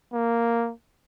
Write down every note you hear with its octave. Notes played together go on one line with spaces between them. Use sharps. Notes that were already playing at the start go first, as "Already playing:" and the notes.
A#3